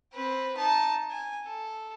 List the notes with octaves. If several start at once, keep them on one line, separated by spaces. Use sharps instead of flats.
C4 B4
D#4 A5
G#5
A4